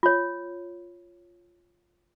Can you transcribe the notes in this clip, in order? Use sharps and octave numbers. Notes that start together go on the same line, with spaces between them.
F4 C#5